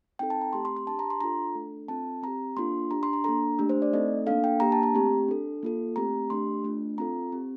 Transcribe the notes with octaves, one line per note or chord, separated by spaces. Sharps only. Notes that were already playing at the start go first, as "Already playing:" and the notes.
C4 D#4 A4 G5
A5
A#5
A3 C4 G4 C6
C6
C6
D4 G4 A5
A#5
C6
D4 F4 A4 A#5
A3 D4 A4
C4 F4 A4 A5
C4 G4 A#5
A#3 D4 F4 A4 C6
D4 G4 A#5
C6
A#5
A#3 D4 A4 A#5
A3 D4 G4
C5
D5
A3 C4 D#4 A4 D#5
A#3 D4 A4 F5
G5
A#3 D4 G4 A#5
A5
A#5
A3 C4 G4
D4 A4
A#3 F4 A4
A3 C4 G4 A#5
A3 D4 G4 C6
A3 D4 F4
C4 F4 A4 A#5
C4 G4